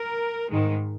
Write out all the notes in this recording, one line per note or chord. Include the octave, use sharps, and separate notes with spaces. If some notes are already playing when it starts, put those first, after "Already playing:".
Already playing: A#4
G#2 D#3 G#3